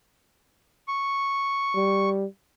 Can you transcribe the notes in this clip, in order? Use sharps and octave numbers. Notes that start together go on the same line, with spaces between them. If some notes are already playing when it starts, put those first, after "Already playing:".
C#6
G3